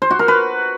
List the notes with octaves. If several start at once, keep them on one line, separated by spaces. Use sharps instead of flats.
C5
F#4
A#4
B4